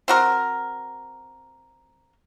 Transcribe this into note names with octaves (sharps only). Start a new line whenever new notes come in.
C4 F#4 A#4